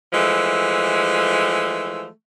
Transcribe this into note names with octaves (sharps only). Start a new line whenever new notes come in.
E3 F3 G#3 A3